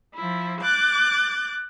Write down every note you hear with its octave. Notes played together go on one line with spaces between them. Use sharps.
F3 E4
D6 F#6 G6 A6